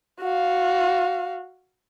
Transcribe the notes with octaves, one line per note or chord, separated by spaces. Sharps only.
F#4 F5